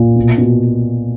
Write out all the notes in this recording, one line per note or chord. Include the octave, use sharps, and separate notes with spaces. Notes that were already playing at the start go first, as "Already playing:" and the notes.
Already playing: A#2
B2
B2